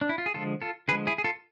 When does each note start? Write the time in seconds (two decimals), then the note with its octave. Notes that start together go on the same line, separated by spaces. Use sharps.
0.01 D4
0.09 E4
0.18 F4
0.26 G#4
0.34 D3 F3 G#3 F4 A4
0.62 F4 A4
0.88 D3 F3 G#3 G#4 B4
1.07 E4 G#4
1.18 G#4
1.24 F4 A4